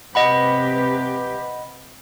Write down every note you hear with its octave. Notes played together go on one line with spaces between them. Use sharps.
C3 G4 B4 D#5 F#5 B5